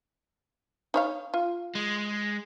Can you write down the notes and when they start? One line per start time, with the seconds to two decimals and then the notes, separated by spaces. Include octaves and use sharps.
0.94 D#4 C#5 F5
1.34 F4
1.75 G#3